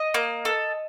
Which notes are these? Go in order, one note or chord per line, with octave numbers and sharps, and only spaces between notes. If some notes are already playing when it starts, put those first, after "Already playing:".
Already playing: D#5
A#3
A4